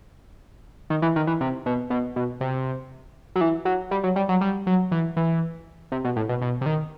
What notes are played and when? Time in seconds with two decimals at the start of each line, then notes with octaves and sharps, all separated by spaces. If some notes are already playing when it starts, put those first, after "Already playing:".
0.90 D#3
1.02 E3
1.16 D#3
1.27 E3
1.41 C3
1.66 B2
1.90 B2
2.16 B2
2.41 C3
3.36 F#3
3.41 E3
3.65 F#3
3.91 G3
4.04 F#3
4.16 G3
4.29 F#3
4.41 G3
4.67 F#3
4.92 E3
5.17 E3
5.92 C3
6.05 B2
6.16 A2
6.29 B2
6.42 B2
6.61 C3
6.66 D#3